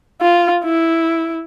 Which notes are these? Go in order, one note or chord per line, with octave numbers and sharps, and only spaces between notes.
F4
E4